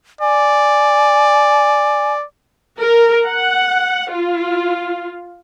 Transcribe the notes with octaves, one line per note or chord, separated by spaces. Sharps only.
D5 G#5
A#4
F#5
F4